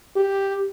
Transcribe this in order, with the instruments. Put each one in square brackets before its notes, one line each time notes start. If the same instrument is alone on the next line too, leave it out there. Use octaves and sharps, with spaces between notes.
[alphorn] G4